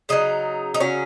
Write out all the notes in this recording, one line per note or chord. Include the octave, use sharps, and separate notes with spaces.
C#3 F#3 D#4
D#4
C#3 F#3 C#4